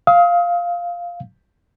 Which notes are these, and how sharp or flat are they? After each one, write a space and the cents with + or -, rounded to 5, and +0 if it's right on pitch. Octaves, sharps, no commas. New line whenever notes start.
F5 +0 D#6 +35